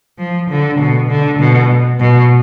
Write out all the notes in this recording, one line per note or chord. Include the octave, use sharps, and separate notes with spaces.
F3
D3
B2
D3
B2
B2